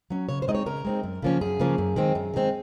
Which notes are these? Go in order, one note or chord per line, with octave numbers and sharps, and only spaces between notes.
F#3 C#4
C#3 C#5
C5
G#3 C4 D#4 D#5
C#5
C#3 A#4
G#3 C4 D#4
F#2
C#3 F3 A#3 C#4
F#2 G#4
C#3 F3 A#3 C#4
F#2
D#3 G#3 C4
F#2
D#3 G#3 C4